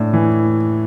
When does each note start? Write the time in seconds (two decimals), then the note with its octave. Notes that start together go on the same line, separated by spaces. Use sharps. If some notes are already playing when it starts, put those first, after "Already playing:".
Already playing: A2 D4
0.13 E3